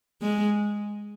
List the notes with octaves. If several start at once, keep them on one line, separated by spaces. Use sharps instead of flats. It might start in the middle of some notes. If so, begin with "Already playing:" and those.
G#3